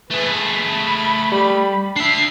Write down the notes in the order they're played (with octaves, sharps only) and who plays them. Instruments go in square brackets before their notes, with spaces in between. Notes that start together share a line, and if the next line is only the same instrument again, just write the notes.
[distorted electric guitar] A3 G#4 [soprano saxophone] B4
[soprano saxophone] B5
[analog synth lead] G3
[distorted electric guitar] D4 E5 [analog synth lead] C7